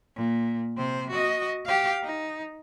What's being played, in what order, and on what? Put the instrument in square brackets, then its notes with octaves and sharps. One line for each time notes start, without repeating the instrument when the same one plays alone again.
[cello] A#2
C3 C5
F#4 D#5
G4 F5
D#4